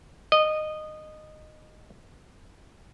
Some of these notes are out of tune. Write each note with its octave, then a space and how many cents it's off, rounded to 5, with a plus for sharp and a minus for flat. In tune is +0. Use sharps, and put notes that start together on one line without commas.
D#5 -15